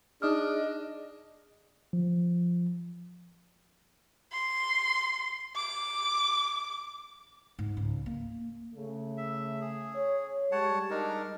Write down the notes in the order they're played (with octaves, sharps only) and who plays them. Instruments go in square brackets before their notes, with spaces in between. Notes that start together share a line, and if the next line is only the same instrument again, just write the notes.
[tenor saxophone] D4 [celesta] D#4 D#6 F6 [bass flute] G#4 [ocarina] D#5
[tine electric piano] F3
[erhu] C6
D6
[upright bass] G#2
C#2
A#3
[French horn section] C#3 A3
[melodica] E5
G#4
[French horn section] C#5
[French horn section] G3 G#3 [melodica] C#5 F#5 A5
[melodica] D4 D#4 A#4